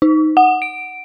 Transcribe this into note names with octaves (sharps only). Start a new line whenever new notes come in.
D#4
F#5
D7